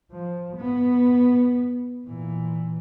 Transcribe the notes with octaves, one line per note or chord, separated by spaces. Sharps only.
F3
B3
A#2 E3